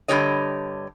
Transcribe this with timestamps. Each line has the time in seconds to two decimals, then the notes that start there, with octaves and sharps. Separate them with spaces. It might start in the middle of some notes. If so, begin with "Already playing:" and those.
0.08 G2 D3 F3 G4 C#5 D#5